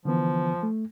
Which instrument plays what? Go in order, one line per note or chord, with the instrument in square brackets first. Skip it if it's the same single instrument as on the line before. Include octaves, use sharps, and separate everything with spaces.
[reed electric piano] D3 E3 B3 [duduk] F3
[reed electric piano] A3